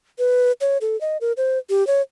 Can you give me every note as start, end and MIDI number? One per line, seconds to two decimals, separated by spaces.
0.19 0.52 71
0.61 0.78 73
0.81 0.99 69
1.01 1.17 75
1.21 1.32 70
1.37 1.58 72
1.70 1.86 67
1.87 2.02 73